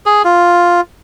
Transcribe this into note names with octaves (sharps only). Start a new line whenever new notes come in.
G#4
F4